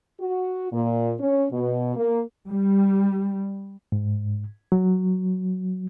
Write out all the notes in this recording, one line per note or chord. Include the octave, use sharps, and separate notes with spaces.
F#4
A#2
C#4
B2
A#3
G3
G#2
F#3